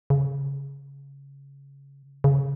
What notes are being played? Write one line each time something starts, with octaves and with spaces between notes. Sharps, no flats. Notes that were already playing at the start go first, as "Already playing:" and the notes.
C#3
C#3